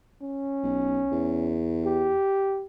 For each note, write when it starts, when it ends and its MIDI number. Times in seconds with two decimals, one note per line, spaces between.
0.22 1.56 61
0.63 1.04 35
1.12 2.16 40
1.84 2.66 67